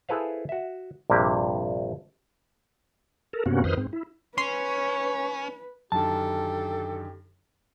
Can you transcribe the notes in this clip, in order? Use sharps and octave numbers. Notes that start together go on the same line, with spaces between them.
E4 G#4 A4 B4 C5 F5
F#4 E5
A#1 G2 C3 A#3 G4
A4 A#4
G2 C3 A#3 B3 C#4 F#4
F2 D#3 B4 C5 D#6 F6
G#2 C4
E4
C#4 B4 C#5 C6
F#2 D3 D#3 G4 A4 A5